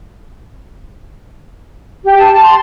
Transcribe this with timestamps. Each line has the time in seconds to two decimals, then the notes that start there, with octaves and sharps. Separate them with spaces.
2.04 G4
2.17 A5
2.31 A5
2.43 C6